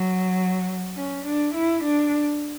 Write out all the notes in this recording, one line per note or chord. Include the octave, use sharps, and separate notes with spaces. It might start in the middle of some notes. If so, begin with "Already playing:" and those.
Already playing: F#3
C#4
D4
E4
D4